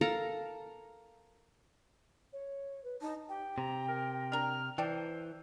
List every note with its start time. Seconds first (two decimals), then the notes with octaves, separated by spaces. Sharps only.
0.01 A4 A#4 F5 A#5
2.33 C#5
2.84 B4
3.01 D#4 A5
3.29 G4 G5
3.58 C3 A#5
3.88 A#4
4.32 D4 A#4 F6
4.78 E3 C5 D5 G5 A5